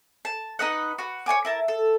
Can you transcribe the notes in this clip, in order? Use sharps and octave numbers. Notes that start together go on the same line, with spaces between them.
A5
D#4 B4 D#5 F#5
F#4 B4
C#5 D5 G#5 D6
E4 A#4 A5
A4